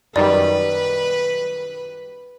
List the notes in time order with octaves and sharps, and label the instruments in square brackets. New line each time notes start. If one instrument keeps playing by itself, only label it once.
[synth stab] F#2 D#3 G3 [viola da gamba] B4 [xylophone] D5